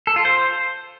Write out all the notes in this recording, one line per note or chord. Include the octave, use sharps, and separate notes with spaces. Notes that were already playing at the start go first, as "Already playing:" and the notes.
A4
F4
C5